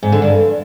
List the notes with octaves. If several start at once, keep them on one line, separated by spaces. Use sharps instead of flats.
G#2
D3
G2